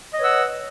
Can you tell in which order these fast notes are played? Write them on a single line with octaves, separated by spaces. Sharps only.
D#5 C#5 B4 E6 F#5